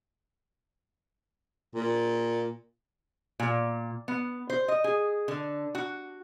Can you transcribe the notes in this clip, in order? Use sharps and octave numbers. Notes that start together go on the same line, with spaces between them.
A#2
A#2
B3
C5
D#5
G#4
D3
F#4